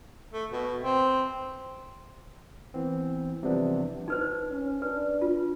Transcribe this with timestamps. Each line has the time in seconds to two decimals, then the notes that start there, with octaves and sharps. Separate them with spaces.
0.33 A3
0.51 B2
0.82 C4
2.74 E3 B3 C4
3.43 C3 E3 F3 G3 B3 D4
4.08 D#4 B4 C5
4.50 C#4
4.82 D4 B4
5.21 F4